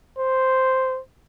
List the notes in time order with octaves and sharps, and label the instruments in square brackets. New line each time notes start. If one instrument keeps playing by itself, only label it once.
[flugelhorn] C5